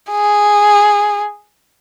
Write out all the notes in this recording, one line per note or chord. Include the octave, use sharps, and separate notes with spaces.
G#4